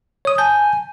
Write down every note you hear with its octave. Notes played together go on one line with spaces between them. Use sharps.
C#5 D#6
G#5 A5 G6